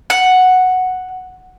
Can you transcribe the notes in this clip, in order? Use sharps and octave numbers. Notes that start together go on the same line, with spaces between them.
F#5